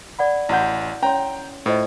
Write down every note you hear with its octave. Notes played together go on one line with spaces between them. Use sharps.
D5 F#5 B5
A1 E4 F#4 F#5 G6
C#4 C#5 G5 A#5 C6
A2 F4 C5 D#5